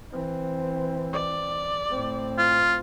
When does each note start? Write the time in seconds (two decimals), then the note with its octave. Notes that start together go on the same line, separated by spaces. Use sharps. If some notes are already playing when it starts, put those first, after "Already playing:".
0.11 E3 C4
1.13 D5
1.90 A2 C4
2.38 F4